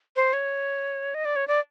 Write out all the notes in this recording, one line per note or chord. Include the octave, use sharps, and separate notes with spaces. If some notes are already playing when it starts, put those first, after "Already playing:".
C5
C#5
D#5
D5
C#5
D5